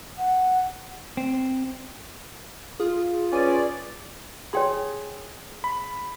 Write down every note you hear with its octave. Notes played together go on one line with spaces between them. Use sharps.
F#5
C4
F4 G#4
C#4 G#4 B4 D5 G#5
G#4 C#5 G5 C6
B5